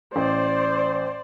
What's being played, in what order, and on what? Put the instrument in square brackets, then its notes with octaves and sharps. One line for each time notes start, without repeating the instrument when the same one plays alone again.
[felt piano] A1 [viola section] C5 D5